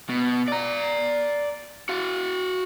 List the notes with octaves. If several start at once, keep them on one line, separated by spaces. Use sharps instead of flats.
B2
D5 A#5
F#4 F5